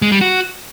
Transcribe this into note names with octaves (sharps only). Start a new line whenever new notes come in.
G#3
G3
F#4